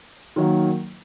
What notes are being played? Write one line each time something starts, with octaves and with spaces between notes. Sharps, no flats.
D#3 F#3 A#3